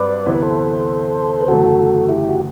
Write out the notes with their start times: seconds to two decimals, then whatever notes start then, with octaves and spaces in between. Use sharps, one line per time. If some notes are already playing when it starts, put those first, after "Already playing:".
Already playing: G2 F#3 C4 B4 D5
0.26 D2 C3 E3 B3 E4 C5
0.34 B4
0.42 A4 C5
1.41 B4
1.48 F#1 E2 D3 F#3 A3 F#4 A4
2.09 E4 G4
2.29 F#4